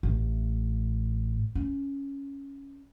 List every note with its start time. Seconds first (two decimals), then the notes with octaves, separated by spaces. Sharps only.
0.03 A1 A2
1.55 C#4